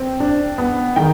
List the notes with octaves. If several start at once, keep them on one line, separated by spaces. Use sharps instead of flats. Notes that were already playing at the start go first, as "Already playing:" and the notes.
Already playing: C4 G5
D4
B3
D#3 G5